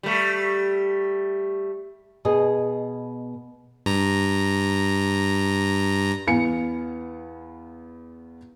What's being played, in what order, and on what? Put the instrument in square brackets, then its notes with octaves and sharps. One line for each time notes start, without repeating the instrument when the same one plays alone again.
[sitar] G3 A3
[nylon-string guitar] B2 G#4 D#5
[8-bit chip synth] G2 A#5
[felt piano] E2 B3 F5 G#5 C#7